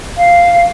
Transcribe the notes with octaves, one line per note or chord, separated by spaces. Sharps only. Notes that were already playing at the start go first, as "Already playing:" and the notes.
F5